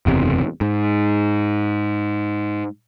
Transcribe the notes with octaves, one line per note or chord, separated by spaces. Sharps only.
F#1 E2 C3
G#2